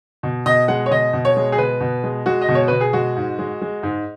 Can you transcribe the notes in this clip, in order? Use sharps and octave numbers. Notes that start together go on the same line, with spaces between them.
B2
B2 D#5
G#3 F#5
C#5
B2 D#5
B2
C#5
G#3
G#4
B2 B4
B2
G#3
G#3 F#4
D#5
B2
C#5
B2 B4
G#4
G#3 F#4
G#2
G#3
G#3
G#2